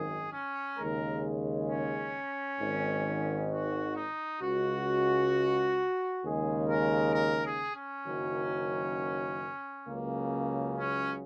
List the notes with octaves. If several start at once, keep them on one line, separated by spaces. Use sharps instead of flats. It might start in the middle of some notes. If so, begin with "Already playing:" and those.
Already playing: G#1 F#2 D#3 G#4
C#4
D#2 C#3 G#3 A#4
C#4
G#1 G#2 D#3
F#4
D#4
C#2 C#3 G#3 F#4
D#2 C#3 G#3 G#4
A#4
A#4
G#4
C#4
F#1 F#2 D#3 F#3
C#2 C#3 F#3 A#3
C#4